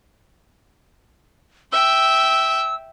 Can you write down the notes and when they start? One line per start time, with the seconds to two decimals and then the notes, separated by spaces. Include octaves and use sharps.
1.73 E5 G5 E6